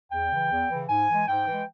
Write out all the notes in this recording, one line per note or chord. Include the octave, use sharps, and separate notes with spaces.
E2 G5
C#3 E3
E2
C#3 E3
G#2 G#5
E3 G#3
G#2 G5
E3 G#3